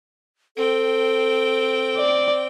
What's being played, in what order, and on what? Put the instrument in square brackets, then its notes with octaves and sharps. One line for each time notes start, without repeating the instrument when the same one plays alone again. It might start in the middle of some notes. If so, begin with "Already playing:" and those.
[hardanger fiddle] C4 G5 [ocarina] A4
[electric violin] D5